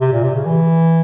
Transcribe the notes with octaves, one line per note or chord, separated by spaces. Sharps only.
C3
A#2
C3
C#3
E3